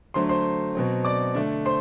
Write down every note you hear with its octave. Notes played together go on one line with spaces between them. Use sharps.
D3 F#3 A3 D4 C5 C6
C5 C6
B2 F#3 C4
D5 D6
D3 A3 D4
C5 C6